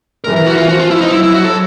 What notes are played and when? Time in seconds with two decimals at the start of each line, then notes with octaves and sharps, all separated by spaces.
0.24 E3 A#4
0.36 A#4
0.47 F#4
0.58 F4
0.69 F3 F#4
0.79 F4
0.90 E4
1.01 D#4
1.12 F#3 E4
1.23 E4
1.34 F#4
1.45 A4